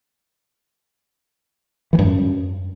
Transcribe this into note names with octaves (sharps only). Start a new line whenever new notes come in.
E3
G2
F#2